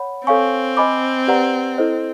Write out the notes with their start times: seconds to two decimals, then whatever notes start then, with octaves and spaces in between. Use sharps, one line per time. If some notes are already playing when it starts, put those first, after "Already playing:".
Already playing: C#5 F#5 B5
0.26 C4 A4 C#5 F5 G#5 C#6
0.77 C5 D#5 G#5 B5 D6
1.28 G4 B4 D5 F#5 A#5
1.78 E4 A4 C5 D#5